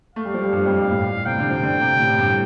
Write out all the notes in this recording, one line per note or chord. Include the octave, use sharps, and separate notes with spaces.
A3 F5
G3
F3
G3
G2
F2
G2
A2
C3 G5
D3
F3
D3
C3
A2
A2
G2